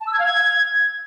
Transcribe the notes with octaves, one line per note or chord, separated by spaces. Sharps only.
A5
E6
G#6
F5
G#6